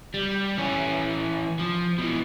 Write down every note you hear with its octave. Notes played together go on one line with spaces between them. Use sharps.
G3
E3 C#4
F3
B2 E3